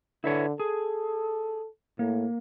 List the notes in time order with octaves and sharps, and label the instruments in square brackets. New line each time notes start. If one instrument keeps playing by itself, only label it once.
[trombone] D3 [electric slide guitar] E4 B4 C#5
[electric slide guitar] G#4 [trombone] A4
[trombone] A2 [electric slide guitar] A#3